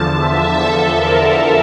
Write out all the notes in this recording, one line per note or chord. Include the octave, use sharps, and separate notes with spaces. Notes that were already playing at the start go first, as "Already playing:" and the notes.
Already playing: E2 D3 F3 A5
E5
A4
A#4